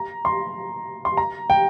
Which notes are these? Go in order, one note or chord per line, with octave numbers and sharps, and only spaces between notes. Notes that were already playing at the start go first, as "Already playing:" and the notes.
Already playing: A#5
C6
C6
A#5
G5